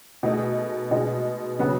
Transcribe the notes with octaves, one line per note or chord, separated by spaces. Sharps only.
B2 A3 D#4 G#4
B2 G#3 D#4
C#3 F#3 B3 F#4